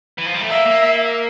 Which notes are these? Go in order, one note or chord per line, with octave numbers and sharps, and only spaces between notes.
E3
F3
G3
A3
A#3 E5
A#3